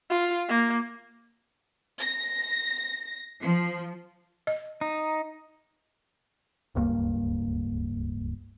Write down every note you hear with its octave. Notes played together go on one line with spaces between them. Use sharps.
F4
A#3
A#6
F3
D#5
D#4
D1 C#2 G2 A#3